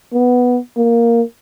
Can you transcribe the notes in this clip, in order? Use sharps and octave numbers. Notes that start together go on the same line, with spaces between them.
B3
A#3